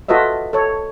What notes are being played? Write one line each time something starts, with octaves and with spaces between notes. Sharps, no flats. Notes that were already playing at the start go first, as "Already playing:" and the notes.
F4 F#4 A4 B4 D#5 E5
A4 C#5